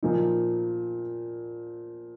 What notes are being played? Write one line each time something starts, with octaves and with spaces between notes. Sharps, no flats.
A#2 F3 D#4